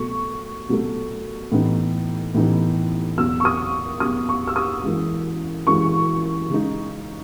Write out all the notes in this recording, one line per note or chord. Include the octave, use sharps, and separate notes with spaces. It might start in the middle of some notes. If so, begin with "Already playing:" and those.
Already playing: B2 F#3 A3 C#6
B2 F#3 A3
A2 E3 B3 D#4
A2 E3 B3 D#4
E2 B2 F#3 E6
C#6
D#6
E2 B2 F#3 D#6
C#6
E6
D#6
F#2 E3 G#3
F#2 E3 G#3 C#6
C#3 G#3 D#4